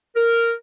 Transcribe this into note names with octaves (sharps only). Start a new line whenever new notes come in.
A#4